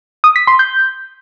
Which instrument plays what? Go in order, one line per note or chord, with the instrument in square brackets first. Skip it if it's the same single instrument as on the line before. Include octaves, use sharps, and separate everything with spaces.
[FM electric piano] D#6
B6
C6
G6